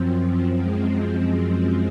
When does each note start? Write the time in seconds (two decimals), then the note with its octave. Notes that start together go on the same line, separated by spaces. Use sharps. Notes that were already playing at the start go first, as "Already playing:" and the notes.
Already playing: F#2 F3 C4
0.61 G#3